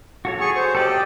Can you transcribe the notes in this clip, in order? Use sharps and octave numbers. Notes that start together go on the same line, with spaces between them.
F#4 A4 C#5
G#4 C#6
C5
G4 A4 D5 D#5